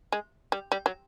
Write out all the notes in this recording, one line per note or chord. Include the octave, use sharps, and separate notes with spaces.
G#3
G3
G3
F#3